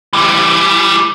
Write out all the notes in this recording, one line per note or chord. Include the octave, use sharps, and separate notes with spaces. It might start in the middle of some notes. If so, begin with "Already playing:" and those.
E3 G3